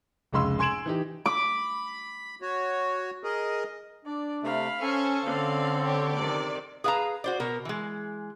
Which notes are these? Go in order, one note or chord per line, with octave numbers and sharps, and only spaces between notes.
F1 C#2 G#3 B5 C6 E6
G#5 C6 G#6 D7 E7 F#7
E3 D#4 G4
B5 D6
F#4 C#5
G#4 A#4 D#5
D4 D5
C3 A3 F5 B5
C#4 A4 C5 G#5 C#6
D3 C4 C#4 D5 F5
G4 C#5
C3 D#3 D5
G#4 B4 F5 A5 A#5
F#4 C5 D5
B2 A#4
E3 G#3